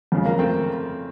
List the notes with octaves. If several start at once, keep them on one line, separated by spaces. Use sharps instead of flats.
F2 C#3 F3
A#3
A3 C4